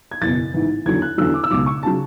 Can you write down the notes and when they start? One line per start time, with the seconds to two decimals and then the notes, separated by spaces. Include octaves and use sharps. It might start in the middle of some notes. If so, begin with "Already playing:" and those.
0.11 G#6
0.22 F#1 E2 B2 A6
0.54 A1 G#2 E3
0.86 E2 D3 F#3 G#6
1.02 F#6
1.18 E2 D3 F#3 E6
1.34 D6
1.44 E6
1.51 C#2 B2 F#3 D6
1.66 C#6
1.83 C#3 F#3 A5